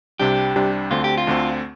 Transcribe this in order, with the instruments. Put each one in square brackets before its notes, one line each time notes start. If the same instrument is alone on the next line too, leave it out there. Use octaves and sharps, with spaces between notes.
[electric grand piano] C2 C3 G3 D4 [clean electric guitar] G4
[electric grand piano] C2 C3 G3 D4
[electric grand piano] D2 D3 A3 C4 [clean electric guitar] F4
[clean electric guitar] G4
F4
[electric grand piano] D2 D3 A3 C4